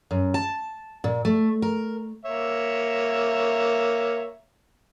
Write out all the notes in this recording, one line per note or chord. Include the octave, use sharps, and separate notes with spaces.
F#2
A5
A#2
A3
A#4
A#3 C#5 E5